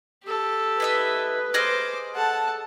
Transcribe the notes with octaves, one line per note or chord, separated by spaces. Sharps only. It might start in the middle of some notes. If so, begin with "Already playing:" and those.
G4 A4
E4 B4 D#5 E5
G#4 C5 D#5 D6 F6
A4 F#5 A5